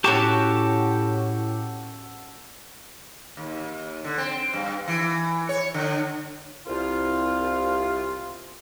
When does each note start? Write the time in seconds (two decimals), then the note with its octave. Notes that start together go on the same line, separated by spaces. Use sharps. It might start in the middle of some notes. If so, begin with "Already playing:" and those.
0.04 A2 C#4 F#4 G4 A4 A5 C#6 D6
3.37 D#2
4.05 D3
4.18 C4
4.54 G2
4.88 E3
5.49 C#5
5.74 D3
6.67 C2 F4